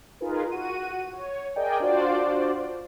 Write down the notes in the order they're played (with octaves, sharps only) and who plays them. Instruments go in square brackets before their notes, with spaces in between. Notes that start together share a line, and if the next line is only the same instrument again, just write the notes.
[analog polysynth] D#4 F4 G#4 A#4 B4
F#4 D#7
C#5
G#4 A#4 D5 D#5 G5 G#5
D4 F4 F#4 C5 D5